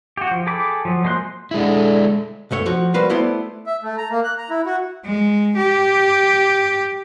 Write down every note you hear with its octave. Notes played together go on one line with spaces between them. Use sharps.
F#4 G4
F3
G#4 A4 G5 B5 D6
F3 F#3
G#3 A#3 C5 C6 F#6
D3 G#3 E4
B1 F#2 A3 C#5
F3 F#4
G3 A#3 F#4 B4 C5
A3 B3 E4 C5 D5
E5
A3
A#5
A#3
F#6
A#5
E4
F#4
G#3
G4